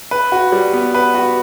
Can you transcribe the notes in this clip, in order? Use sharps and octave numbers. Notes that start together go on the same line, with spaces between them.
B4
F#4
G3
B3
B4
F#4